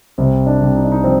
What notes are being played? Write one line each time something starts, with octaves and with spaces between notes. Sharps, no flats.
C2 C4
D4
C2
D#4
D4
D#4
F3 C4